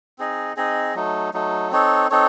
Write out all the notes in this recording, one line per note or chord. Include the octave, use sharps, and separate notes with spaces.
C4 D#4 G#4 D#5
C4 D#4 G#4 D#5
F#3 A3 D#4
F#3 A3 D#4
C4 D#4 A4 C#5
C4 D#4 A4 C#5